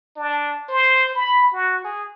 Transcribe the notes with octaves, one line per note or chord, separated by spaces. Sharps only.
D4
C5
B5
F#4
G#4